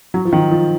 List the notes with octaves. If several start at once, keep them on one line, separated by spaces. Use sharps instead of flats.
F#3
F3
D#3
F3